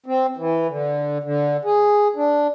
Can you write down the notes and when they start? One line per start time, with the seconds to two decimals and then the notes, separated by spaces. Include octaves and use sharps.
0.06 C4
0.37 E3
0.68 D3
1.23 D3
1.65 G#4
2.16 D4